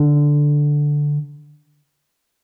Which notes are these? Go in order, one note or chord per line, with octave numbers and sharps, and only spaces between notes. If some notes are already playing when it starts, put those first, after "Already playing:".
Already playing: D3